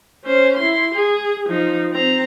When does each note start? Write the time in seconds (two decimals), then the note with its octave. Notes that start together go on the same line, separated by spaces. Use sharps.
0.25 C#4 C5
0.57 E4 C6
0.95 G#4
1.49 F3 D#4
1.92 C4 A#5